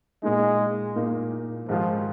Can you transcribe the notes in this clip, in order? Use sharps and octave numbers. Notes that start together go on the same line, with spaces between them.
A#2 G#3 A#3 D#4
A#2 A#3 D#4
G#2 D#3 F3 G#3 F4